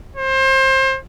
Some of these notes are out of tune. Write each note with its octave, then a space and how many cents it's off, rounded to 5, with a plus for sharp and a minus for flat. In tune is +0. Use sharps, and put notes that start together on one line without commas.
C5 +30